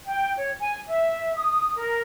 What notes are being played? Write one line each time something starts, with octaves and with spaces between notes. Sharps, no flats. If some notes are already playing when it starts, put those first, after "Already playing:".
G5
C#5
G#5
E5
D#6
A#4